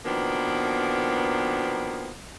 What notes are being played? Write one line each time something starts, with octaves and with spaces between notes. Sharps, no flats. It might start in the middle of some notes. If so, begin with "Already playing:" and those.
B2 D#3 F3 A#3 B3 D4